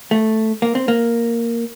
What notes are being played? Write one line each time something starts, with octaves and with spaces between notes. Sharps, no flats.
A3
A#3
C4
A#3